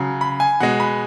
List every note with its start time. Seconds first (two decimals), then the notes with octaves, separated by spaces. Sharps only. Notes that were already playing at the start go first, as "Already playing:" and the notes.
Already playing: C#3 F#3
0.21 B5
0.40 G#5
0.60 B2 G#3 F#5
0.80 B5